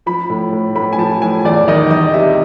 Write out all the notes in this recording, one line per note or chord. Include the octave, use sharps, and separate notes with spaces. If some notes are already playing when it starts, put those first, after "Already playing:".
F3 B5
A2
A2
A2 B5
G#5
F3 A5
A2 G#5
E2 D5
D#3 D#5
E2 D#5
C3 E5